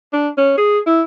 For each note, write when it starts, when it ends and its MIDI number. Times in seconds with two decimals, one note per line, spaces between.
0.13 0.29 62
0.38 0.57 61
0.58 0.78 68
0.86 1.02 64